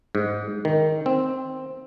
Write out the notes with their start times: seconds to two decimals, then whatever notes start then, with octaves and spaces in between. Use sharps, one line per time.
0.15 G#2
0.65 D#3
1.06 C4